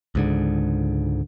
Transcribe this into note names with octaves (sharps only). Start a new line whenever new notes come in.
C#2 G#2 D3